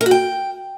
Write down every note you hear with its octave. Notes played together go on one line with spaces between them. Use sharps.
A#4
F#4
G5